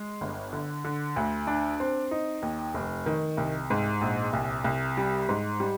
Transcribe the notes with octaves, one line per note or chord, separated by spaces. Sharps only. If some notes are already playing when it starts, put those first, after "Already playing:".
Already playing: G#3
G1
D3
D3
D2
D4
C4
D#4
D#2
F1
D#3
C2
G#2
A#1
C2
C2
G3
G#2
G3